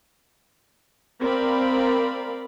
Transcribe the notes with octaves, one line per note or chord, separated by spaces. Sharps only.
C4 A#4 D5 F5 A#5 B5